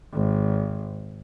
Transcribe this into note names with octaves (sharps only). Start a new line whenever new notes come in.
G#1